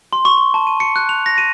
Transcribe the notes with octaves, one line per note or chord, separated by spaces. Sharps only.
C6
C#6
G7
A5
D#7
C#7
F#6
F7
A#6
D#7